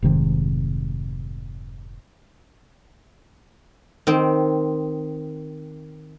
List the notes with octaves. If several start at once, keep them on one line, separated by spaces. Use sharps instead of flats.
F1 G#2 C3 D#3
D#3 C4